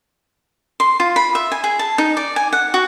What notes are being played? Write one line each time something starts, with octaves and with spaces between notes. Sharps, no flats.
C6
F4
B5
E5
G#5
G#4
A5
D#4
D5
G#5
F#5
F#4